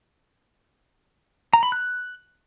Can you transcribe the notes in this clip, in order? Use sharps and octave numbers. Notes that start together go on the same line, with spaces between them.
A#5
B5
F#6